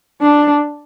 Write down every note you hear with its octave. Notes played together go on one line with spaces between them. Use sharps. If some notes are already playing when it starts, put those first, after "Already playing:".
D4